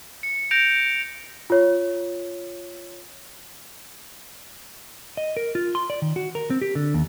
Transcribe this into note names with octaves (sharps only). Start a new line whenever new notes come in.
C#7
G6 A#6 D7 F7
F4 C#5
D#5
A#4
F4
C6
D5
D#3
F#4
A#4
C4
G4
D3
D#2